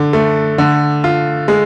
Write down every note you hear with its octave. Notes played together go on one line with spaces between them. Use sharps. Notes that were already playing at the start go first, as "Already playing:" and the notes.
Already playing: D3
A3
D3
F4
G#3